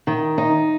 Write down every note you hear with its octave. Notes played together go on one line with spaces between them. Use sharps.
D#3
D#4